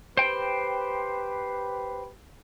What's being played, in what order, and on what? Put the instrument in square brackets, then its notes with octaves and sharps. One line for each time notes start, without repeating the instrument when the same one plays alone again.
[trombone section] G4 B4 [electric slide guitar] C5 G5